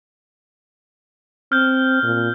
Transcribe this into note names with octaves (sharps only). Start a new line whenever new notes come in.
C4 F6 G6
A#2